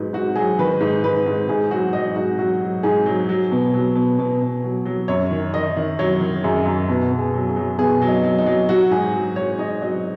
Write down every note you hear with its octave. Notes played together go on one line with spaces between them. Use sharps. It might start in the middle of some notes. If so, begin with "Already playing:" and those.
Already playing: G#2 F#3 B4
G#2 F#4
F#3 G#4
D#3 B4
G#2
G#2 B4
G#2
G#2 G#4
F#3 F#4
F#3 D#5
G#2 F#4
F#3 F#4
F#3
G#2 G#4
F#3
F#3
B2
F#3
B2
B2
B2
F#3
F#3
F#2 C#5
D#3
D#3 D#5
D#3
F#3 C#5
D#3
F#2 G#4
F#2
B2 F#4
B2
G#4
F#3
G#4
F#3
B2 G#4
F#3
D#4
F#3
D#4
F#3
F#3 F#4
G#2 G#4
F#3
F#3 C#5
G#2 D#5
F#3 D#5